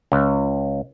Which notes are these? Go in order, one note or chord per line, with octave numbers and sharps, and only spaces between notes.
C#2